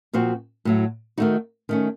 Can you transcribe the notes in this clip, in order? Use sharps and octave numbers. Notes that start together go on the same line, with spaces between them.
A#2 F3 C4 F#4
A2 F#3 A3
D#3 A3 D#4 F#4
D#3 A3 C#4